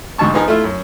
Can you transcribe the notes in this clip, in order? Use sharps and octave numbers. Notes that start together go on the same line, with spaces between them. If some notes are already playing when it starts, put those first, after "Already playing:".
D2 G#2 B2 A5 C#6
F3 B3 D#4 G#4 A#4
A3 E4 F4
F#2